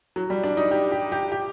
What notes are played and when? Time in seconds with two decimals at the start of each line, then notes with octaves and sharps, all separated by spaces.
0.16 F#3
0.30 G3
0.44 D4
0.57 D#4
0.71 G4
0.92 G4
1.12 G4
1.32 G4